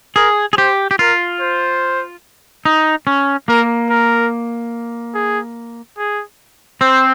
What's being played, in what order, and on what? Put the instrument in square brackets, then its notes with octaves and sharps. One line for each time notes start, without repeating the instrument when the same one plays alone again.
[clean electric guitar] G#4 [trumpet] A#4
[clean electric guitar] G#4
[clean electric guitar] G4 [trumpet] C5
[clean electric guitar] G4
[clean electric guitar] F4 [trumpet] A#4
[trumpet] C5
[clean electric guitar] D#4
C#4
[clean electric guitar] A#3 [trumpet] A#4
[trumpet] A#4
G#4
G#4
[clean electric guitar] C4 [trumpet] C5